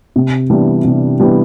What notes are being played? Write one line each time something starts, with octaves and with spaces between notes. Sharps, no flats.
C3
E3 G3 B3 D4
C3
E3 G3 B3 D4